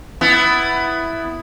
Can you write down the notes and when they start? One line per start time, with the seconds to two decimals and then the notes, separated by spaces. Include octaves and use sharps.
0.21 B3 E4